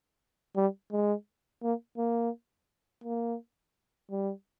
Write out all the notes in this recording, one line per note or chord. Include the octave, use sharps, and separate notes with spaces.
G3
G#3
A#3
A#3
A#3
G3